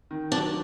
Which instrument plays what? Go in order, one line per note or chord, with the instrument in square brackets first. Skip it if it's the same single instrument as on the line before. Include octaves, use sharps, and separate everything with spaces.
[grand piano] D#3
[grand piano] F#3 [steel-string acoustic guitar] D4